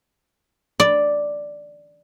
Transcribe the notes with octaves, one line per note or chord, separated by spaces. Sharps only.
D5